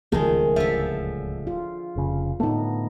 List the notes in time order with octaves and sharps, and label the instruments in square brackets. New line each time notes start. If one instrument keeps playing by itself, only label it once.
[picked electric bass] D1 C#2 A3 [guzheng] D#3 G#3 [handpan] F3 G#4
[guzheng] D3 F3 [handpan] E5
[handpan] F4
[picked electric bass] F1 C#3
[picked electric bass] A2 D3 A3 [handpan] B3 D#4